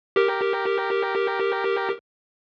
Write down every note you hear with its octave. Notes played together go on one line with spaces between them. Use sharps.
G4 A#4